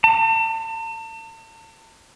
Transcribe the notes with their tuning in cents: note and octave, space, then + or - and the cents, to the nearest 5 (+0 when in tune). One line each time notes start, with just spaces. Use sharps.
A5 +40